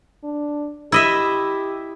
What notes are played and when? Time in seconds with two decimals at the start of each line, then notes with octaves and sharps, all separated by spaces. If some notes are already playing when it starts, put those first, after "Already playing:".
0.24 D4
0.92 E4 G4 D#5 E5